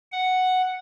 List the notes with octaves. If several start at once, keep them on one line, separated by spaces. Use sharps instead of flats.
F#5